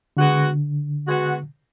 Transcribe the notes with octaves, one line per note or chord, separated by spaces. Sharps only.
D3 G#3 B3 F#4
G#3 B3 F#4